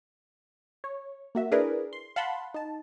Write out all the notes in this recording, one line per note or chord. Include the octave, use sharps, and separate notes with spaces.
C#5
A#3 F#4 E5
D4 E4 G#4 A#4 B4 D5
C6
F5 F#5 A5 B5 C6
D#4 A5